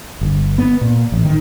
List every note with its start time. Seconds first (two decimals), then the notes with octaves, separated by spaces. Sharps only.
0.21 G1
0.58 B3
0.81 A#2
1.12 A1
1.25 D#3